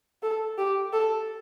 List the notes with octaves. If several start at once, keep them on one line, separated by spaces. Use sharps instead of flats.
A4
G4
A4